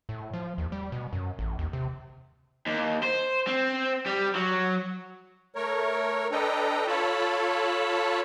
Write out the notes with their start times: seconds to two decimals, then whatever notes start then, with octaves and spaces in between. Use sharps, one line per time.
0.09 A2
0.33 F3
0.58 D#2
0.72 G3
0.92 B2
1.13 F#2
1.39 A1
1.59 D#2
1.73 C3
2.67 D#2
3.03 C5
3.47 C4
4.06 G3
4.35 F#3
5.54 A3 A#4 C#5
6.32 D4 A4 B4 D#5 G5 A#5
6.87 F4 A4 C#5 A5 B5